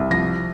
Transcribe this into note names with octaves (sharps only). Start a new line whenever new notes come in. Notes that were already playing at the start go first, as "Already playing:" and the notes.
Already playing: C2
F3 A#6